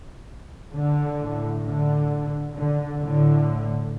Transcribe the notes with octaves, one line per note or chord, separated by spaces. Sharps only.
D3
A2
D3
D3
A2 D3